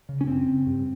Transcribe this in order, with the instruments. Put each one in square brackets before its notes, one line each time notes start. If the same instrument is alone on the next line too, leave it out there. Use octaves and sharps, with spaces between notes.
[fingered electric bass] C#3
C#4
F#2 C4
C#3
G2